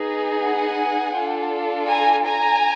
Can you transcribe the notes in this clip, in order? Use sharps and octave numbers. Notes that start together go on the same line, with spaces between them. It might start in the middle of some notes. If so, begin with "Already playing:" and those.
Already playing: B3 D#4 G#4
F#5 G#5
D4 F4 A4
G#5 A#5
G#5 A#5